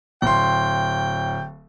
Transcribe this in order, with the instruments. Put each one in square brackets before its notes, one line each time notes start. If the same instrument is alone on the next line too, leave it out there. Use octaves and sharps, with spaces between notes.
[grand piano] D1 C6 [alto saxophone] G5